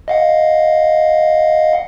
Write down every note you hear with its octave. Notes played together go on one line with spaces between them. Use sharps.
D#5 F5 F#5